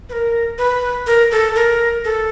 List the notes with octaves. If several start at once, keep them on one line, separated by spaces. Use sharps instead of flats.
B4
A#4
B4
A#4
A4
A#4
A4